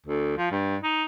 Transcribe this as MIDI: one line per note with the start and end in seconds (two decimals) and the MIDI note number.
0.06 0.37 38
0.38 0.49 53
0.52 0.77 43
0.83 1.04 63